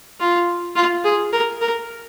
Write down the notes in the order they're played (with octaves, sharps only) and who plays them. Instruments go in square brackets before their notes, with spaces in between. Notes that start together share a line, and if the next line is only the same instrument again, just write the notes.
[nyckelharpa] F4
F4
G#4
A#4
A#4